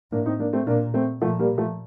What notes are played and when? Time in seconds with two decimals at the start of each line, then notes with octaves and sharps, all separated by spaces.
0.12 A2 A#3 D4
0.26 C4 D#4
0.40 A#3 D4
0.53 A3 C4
0.67 A#2 A#3 D4
0.94 A3 C4
1.22 A#2 F3 A3
1.39 G3 A#3
1.58 F3 A3